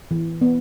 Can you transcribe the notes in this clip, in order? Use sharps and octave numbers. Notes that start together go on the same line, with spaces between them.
E3
B3